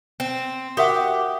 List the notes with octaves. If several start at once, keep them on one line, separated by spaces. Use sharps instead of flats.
C4
F#4 G4 A#4 E5 F#5 D#6